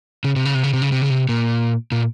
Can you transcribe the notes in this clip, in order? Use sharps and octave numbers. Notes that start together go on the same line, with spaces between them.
C#3
C3
C#3
C3
C#3
C3
C#3
C3
C#3
C3
A#2
A#2